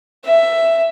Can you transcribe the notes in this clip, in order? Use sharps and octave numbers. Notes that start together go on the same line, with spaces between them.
E5